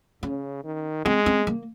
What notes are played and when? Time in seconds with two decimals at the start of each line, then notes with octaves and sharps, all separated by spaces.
0.23 C#3 C#4
0.64 D#3
1.05 G#3 C4
1.26 C4
1.47 A#3